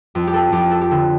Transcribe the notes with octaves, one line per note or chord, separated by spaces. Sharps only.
F2
G4
A4
F2 G4
A4
G4
D3 A4